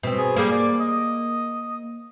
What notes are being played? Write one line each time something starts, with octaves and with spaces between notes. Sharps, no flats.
B2 C4
G#4
G3 A#3 G#4
D5
D#5